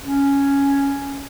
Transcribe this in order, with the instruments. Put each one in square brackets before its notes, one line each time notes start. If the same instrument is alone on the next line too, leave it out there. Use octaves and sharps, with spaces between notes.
[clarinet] C#4